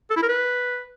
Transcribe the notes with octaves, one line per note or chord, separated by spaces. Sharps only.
A4
E4
A#4
B4